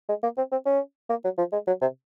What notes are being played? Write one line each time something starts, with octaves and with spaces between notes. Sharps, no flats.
G#3
A#3
C4
C4
C#4
A#3
F#3
F3
G#3
F#3
C3